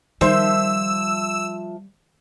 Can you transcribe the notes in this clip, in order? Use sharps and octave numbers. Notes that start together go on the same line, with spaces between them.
D#3 F3 G3 C5 E5 E6